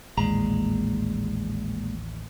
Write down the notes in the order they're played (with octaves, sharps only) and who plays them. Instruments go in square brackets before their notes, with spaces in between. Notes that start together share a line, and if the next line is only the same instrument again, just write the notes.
[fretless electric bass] A1 D#2 [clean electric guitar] A#2 G#3 A#5